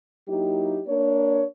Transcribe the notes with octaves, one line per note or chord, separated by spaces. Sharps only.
F#3 A#3 D#4 E4 G4
A#3 D4 A#4 C#5